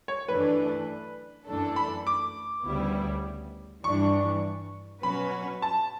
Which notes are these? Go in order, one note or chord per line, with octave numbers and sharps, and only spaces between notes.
C#5
F#2 E3 A3 D4 B4
F#2 E3 A3 D4 A4
B5
D6
D2 C#3 G3 B3 E4
G2 E3 G3 D4 C#6
B2 F#3 C#4 F#4 B4 B5
A5